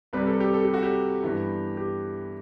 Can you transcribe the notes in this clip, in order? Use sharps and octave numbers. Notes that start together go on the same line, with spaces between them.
C2 C3 G3 B4
A4
G4
A4
G4
F#4
G4
G2 E3 B3
G4